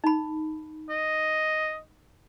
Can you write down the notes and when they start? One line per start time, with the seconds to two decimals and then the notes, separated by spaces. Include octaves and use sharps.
0.04 D#4 B5
0.90 D#5